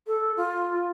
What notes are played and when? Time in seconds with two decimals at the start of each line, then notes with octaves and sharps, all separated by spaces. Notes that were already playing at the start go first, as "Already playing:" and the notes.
0.07 A4
0.37 F4